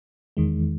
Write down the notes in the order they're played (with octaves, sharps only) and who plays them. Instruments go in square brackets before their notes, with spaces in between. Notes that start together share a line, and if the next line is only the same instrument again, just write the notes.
[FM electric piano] E2 D#3 G#3